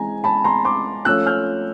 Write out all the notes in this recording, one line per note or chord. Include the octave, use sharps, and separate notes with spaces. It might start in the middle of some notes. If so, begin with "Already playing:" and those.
Already playing: E3 G#3 C4 G#5 A#5
A5 B5
A#5 C6
C6 D6
F3 A3 C#4 F4 E6 F#6
F6 G6